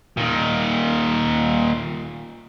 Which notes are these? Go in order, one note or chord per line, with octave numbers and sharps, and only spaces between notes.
A#2 D#3